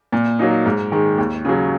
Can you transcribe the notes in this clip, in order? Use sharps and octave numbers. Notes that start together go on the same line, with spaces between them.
A#2
F#3 A#3 D#4
G#2
D#3 G#3
D#2
C#3 F#3